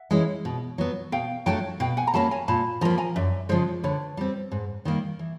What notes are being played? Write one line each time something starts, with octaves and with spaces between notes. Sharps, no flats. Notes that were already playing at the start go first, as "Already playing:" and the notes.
Already playing: E5 F#5
E3 G#3 C#4 E4
B2
F#3 B3
B2 F5 G5
F#3 A3 D4 G5 A5
B2 F5 G5
F#5 G#5
A#5
F#3 A#3 C#4 A5 B5
G#5 A#5
A#2 A5 B5
F3 A#3 A#5 B5
G#5 A#5
F#2 D5 E5
C#3 F3 G#3 C5 D5
D3 B4 C#5
G3 C4
G#2
D#3 G3 A#3
E3